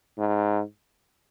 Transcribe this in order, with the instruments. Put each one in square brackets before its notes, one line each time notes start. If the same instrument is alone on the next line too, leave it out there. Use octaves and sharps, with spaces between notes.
[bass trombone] G#2